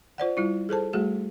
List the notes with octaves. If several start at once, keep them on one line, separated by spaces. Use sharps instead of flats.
F4 C5 D5 F#5
G3 E4 F4
G#4 A4 C5 A5
G3 A3 F#4 G#4